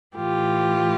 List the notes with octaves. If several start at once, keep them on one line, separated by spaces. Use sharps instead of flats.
A2 E3 F4 G4